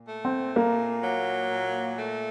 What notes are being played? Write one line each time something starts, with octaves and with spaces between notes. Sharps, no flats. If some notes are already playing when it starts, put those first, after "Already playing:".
Already playing: A#2
A3
C4
A#2 A#3
F#3
A#2
A3